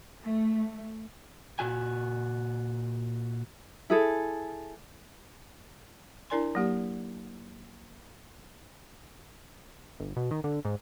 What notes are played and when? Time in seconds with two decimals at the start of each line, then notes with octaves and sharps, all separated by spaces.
0.24 A3
1.59 A#2 F#4 G#5
3.90 E4 G#4 A4
6.30 D4 E4 A#4 D5 G#5 C6
6.55 F#3 A#3 G4
10.00 G1
10.16 B2
10.31 D#3
10.44 D3
10.65 G#2